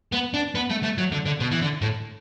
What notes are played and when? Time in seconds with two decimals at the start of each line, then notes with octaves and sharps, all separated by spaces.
0.12 B3
0.34 D4
0.55 B3
0.70 A3
0.83 A3
0.98 F#3
1.12 D3
1.26 D3
1.41 B2
1.52 E3
1.61 D3
1.82 A2